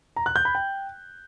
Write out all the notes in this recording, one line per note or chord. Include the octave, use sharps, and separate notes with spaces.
A#5
F#6
G6
B5
G5